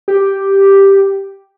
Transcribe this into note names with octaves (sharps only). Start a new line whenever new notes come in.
G4